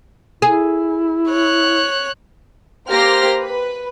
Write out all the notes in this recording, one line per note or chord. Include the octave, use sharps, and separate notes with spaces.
E4 G#4
C#5 F#6
A#3 G4 C5 F6 A#6
B4